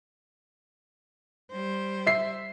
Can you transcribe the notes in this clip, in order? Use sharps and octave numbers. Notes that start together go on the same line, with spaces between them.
G3 C5
E5 C7